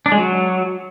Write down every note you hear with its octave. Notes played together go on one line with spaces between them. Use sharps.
D4
G#3
F#3